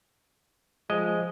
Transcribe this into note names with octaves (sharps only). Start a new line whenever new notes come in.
F3 G#3 D#5